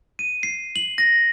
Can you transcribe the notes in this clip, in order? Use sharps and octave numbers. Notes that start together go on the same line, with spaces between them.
D#7
C7
F#7
A#6